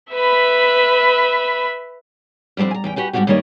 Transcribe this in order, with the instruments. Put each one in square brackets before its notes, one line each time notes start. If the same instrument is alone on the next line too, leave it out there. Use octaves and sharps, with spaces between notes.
[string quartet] B4 E5 B5
[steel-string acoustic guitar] F2 G3 A#3 C4 D4
G#5 A#5
E2 C#4 G5
F#4 G4 B4 G#5
G#2 G3 D4 D#4 F#4 G4
G2 D#3 G3 A#3 C#5 D#5